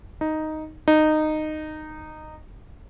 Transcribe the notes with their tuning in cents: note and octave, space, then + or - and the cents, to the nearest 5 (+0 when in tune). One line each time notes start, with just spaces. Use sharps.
D#4 +0
D#4 -15